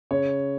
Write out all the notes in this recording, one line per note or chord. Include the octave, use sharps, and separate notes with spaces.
C#3 C#5